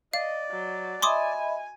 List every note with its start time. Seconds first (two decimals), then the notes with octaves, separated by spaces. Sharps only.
0.14 D5 D#5 F5
0.50 F#3
1.02 D#5 E5 G#5 B5 C6 D6 D#6